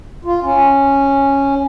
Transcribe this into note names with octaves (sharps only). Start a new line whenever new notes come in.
F4
C#4